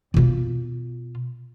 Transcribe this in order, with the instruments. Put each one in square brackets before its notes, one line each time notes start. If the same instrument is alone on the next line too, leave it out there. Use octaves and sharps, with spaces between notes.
[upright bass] B2 F4